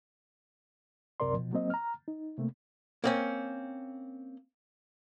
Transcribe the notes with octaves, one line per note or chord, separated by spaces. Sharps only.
C#2 F#2 C3 A#4 D5 C6
B2 F3
F#3 A#3 C4 D#5
A#5 F6
D#4
C3 A3 A#3
A#3 C4 C#4